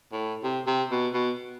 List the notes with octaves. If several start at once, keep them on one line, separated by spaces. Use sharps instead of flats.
A2
C3
C3
B2
B2